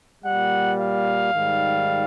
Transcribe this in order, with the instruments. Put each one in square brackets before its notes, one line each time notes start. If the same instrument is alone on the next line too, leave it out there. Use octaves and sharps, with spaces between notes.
[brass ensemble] A#2 G3 F#5
F5
G#2 D#3 G3